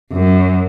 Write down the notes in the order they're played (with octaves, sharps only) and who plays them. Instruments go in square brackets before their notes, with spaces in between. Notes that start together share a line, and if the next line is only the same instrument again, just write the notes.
[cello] F#2